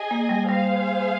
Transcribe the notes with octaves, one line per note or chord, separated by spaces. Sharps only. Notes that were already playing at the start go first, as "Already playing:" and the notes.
Already playing: G#4 D#5 G#5
A#3
G3
G3 G#4 C5 F5